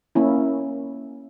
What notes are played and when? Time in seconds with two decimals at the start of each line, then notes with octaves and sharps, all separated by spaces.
0.15 A#3 C#4 E4